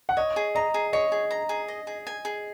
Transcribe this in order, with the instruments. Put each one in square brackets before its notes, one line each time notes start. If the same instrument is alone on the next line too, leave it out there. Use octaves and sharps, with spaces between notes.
[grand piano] F#5
[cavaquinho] C#5 [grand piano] D#5
[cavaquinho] G#4
[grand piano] D#5 [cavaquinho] A#5
[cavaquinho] G#4
[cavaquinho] C#5 [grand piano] D#5
[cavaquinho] G#4
A#5
G#4
D#5
G#4
G#5
G#4